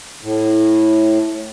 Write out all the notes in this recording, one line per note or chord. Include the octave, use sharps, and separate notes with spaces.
A2